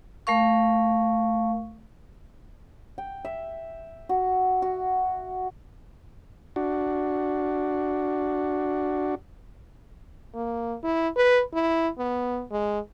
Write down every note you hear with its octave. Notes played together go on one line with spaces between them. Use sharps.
A3 A#4 F5 C#6
G5
E5
F#4
F#4
D4 F#4
A#3
E4
B4
E4
B3
G#3